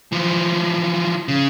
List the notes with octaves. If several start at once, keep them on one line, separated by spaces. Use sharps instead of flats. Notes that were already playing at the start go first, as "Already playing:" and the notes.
E3 F3
C#3